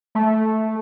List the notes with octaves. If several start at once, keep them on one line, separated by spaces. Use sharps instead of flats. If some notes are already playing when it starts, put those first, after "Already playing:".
A3